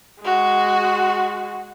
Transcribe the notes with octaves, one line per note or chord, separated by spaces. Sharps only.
G#3 F#4